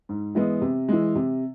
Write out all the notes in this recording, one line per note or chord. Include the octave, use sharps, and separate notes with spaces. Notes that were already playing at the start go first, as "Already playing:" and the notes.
G#2
E3 G#3 B3
C3
E3 G#3
C3